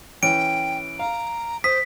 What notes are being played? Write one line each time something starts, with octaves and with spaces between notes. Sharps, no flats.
E3 C#4 G5 D7
F5 A#5
C5 D#6 B6